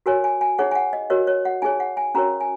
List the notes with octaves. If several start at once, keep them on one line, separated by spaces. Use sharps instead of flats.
F#4 A#4 C#5 G#5
G#5
G#5
D#4 G#4 C#5 F#5
G#5
F#5
D#5
F#4 A#4 C#5 D#5
C#5
F#5
D#4 G#4 C#5 G#5
F#5
G#5
C#4 F#4 A#4 C#5 A#5
G#5